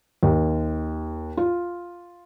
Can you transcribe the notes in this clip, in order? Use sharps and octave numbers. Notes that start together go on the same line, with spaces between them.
D#2
F4